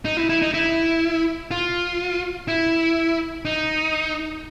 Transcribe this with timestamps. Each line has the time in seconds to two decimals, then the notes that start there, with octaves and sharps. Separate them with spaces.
0.05 D#4
0.17 E4
0.29 E4
0.42 D#4
0.54 E4
1.51 F4
2.48 E4
3.45 D#4